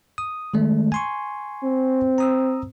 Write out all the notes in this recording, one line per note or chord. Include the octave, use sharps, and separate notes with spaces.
D#6
D#3 G#3 A3
G#5 C6 C#6
C4
A#5 D#6 E6